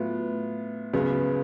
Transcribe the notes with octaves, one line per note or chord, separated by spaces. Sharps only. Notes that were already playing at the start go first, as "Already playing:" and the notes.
Already playing: A2 F#3 B3 F4
C#2 C#3 F#3 B3